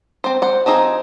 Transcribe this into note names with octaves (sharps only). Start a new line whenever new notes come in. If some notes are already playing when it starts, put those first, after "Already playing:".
C4 C5
C5 F#5
F3 C4 D#4 G#4